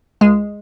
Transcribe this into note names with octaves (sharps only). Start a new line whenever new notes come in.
C#2 G#3